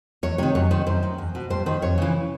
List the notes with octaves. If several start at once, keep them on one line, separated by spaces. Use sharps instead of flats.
E2 C#5
C3 D#3 C#5
F#2 C#5
D#3 C5
F#2 C5
D#3
E2
B2
G2 C5
D#3 C5
F2 C#5
C#3 E3